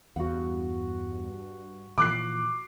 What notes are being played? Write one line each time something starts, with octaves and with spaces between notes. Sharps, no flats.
E2 G2 F#4 F#5
A#2 E3 F3 D6 F#6 C7